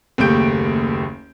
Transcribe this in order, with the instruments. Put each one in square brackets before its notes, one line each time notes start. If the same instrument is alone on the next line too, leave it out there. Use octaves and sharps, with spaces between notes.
[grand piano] F#1 D#2 A3 G4 G6 D7